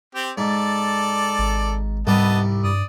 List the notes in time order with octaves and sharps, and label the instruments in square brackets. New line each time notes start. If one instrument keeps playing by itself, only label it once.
[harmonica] C4 G4
[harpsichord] G#2 [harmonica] A4 D5
[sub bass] G#1
[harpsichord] C2 G3 [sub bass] G#2 [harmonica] B3 D#5 A5
[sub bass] G2 [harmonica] D5 D#6